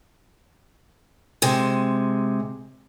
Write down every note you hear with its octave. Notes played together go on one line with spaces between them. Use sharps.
C3 G#3